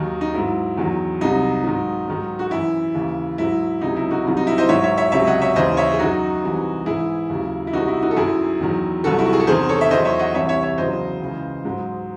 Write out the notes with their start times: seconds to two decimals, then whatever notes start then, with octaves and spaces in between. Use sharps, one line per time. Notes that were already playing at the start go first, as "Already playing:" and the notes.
Already playing: D#2 D#3 F#3 D#4 F#4
0.21 D#4
0.34 G#2 F#3 E4
0.77 E2 D#3 F#3
1.21 C2 C3 F#3 D#4
1.64 G#2 D#3 F#3
2.08 G#2 D#3 F#3
2.39 F#4
2.51 F#2 E3 E4
2.94 D#2 C#3 E3
3.38 G#2 F#3 E4
3.81 C#2 C3 F#3 D#4
3.96 E4
4.11 D#4 F#4
4.25 C2 C3 D#3 F#3
4.37 D#4
4.47 E4
4.58 C5 D#5
4.69 G#2 D#3 F#3 C#5 E5
4.84 C#5 E5
4.97 C#5 E5
5.12 C#2 C3 F#3 C#5 E5
5.27 D#5 F#5
5.41 C#5 E5
5.56 D#2 C#3 E3 C5 D#5
5.77 C#5 E5
5.92 G#4
5.99 F#2 D#3 F#3 D#4 F#4
6.42 C2 C3 E3
6.86 G#2 E3 E4 G#4
7.30 D#2 C#3 F#3
7.67 E4
7.73 C2 C3 D#3 D#4 F#4
7.88 E4
8.03 D#4 F#4
8.11 A4
8.16 F#2 D#3 F#3 E4 G#4
8.60 E2 D#3 F#3
9.04 C2 C3 D#3 F#3 F#4 A4
9.18 E4
9.25 F#4
9.33 G#4
9.40 A4
9.47 E2 C3 D#3 G#4 C5
9.69 A4 C#5
9.81 E5
9.91 E2 D#3 F#3 C5 D#5
10.05 C#5 E5
10.19 D#5 F#5
10.34 C2 C3 E3 C#5 E5
10.49 C#5 E5
10.63 C#5 E5
10.78 E2 C#3 F#3 C5 D#5
11.22 C#2 C#3 E3
11.65 G#2 F#3